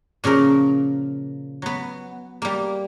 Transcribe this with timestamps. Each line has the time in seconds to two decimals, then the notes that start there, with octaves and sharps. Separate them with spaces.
0.24 A#2 C#3 F3 A#4
1.62 F#3 B3
2.42 G3 A#3